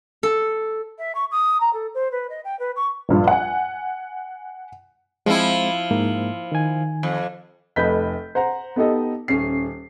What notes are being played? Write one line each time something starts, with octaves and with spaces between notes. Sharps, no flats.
A4
E5
C#6
D#6
A#5
A4
C5
B4
D#5
G5
B4
C#6
A#1 G2 F4
F#5 G#5
F3 G#3 C4 E4
G#2 A#3
D#3 G#5
F2
F1 A3 B4 D#5 G6 B6
C5 F#5 A#5
B3 D#4 G4 A4 D#5
D#1 C#4 C7